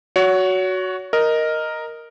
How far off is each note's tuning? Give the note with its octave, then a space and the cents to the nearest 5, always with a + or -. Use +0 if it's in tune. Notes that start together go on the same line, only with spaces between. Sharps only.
F#4 +0 C#5 +30
A#4 +0 D#5 +0